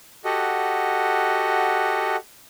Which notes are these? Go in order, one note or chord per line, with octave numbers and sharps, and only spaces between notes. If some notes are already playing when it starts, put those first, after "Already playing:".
F#4 G4 A4 D#5 F#5